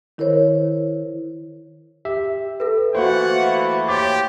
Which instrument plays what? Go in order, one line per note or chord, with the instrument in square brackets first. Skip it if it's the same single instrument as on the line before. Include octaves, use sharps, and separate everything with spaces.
[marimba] D#3 E4 A#4 C5 C#5
[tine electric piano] G4 E5
[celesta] A4 B4
[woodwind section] E3 A3 A#3 [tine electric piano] F#4 C5 [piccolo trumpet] F#5
[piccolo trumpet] G4 [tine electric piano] C#5 C6 A6 [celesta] D6